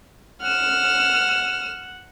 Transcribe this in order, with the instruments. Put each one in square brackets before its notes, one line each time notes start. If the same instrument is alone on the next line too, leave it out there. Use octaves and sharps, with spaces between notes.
[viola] F#5 [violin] F6 E7